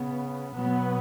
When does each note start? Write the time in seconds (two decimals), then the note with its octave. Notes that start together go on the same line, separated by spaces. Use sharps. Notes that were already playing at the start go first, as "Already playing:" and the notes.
Already playing: C#3 B3
0.56 B2 F#3 B3